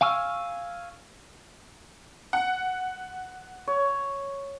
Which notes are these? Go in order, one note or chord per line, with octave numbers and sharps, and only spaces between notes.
F5 G#5 C#6 E6 F6
F#5
C#5